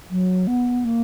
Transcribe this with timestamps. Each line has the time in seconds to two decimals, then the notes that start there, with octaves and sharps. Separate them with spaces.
0.11 F#3
0.47 B3
0.85 A#3